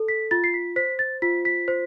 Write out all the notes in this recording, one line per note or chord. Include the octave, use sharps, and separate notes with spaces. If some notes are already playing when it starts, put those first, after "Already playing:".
Already playing: A4
B6
F4 A6
C7
B6
C5 B6
A6
F4 B6
B6
C5